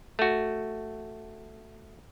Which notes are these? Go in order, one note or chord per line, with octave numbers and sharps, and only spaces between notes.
A3 F#4